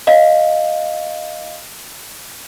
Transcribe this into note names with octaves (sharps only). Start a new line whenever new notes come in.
D#5 F5